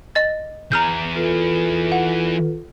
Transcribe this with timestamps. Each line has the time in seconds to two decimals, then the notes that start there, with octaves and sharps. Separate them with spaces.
0.15 D#5 A6
0.72 E3 G#4 A#5 F6 G6
1.15 F4 A4 B4
1.92 F#5